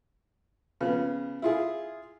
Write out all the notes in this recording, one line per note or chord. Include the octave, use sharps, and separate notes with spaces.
C#3 F3 B3
E4 F4 G#4